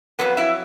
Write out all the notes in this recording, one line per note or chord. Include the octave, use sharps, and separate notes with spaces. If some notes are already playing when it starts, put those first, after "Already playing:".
F2 C#3 F#3 B3 B4
E4 E5